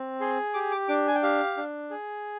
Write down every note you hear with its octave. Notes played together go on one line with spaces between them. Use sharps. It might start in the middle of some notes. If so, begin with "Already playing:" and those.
Already playing: C4
G#4 C6
G4 D6
D6
D4 D6
G#5
G5
G4 F5
D4
G#4